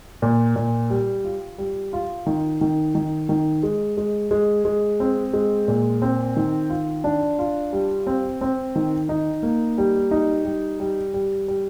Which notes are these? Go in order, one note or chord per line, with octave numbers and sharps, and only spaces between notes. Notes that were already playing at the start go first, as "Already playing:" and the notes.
A#2
A#2
G3
F4
G3
F4
D#3
D#3
D#3
D#3
G#3
G#3
G#3
G#3
C4
G#3
A#2
C4
D#3
F4
D4
F4
G3
C4
C4
D#3
D#4
A#3
G3
D#4
G3
G3
G3
G3